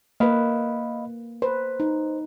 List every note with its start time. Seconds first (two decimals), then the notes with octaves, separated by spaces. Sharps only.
0.20 A#3 B4 D#5 F5 B5
1.42 B4 C5
1.80 D#4